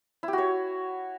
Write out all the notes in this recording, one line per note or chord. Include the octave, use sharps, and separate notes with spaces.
E4
G4
F#4
C#5